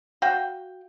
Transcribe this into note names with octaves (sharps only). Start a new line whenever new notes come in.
F#4 F5 G5